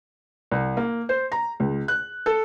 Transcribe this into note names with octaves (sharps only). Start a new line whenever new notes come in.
C2
A#3
C5
A#5
C#2
F#6
A4